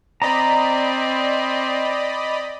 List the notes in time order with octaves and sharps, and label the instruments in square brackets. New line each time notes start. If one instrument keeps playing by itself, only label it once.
[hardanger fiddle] C4 [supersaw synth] D5 D#5 B5 [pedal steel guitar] A#5